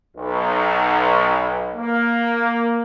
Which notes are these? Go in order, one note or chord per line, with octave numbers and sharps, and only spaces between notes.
B1
A#3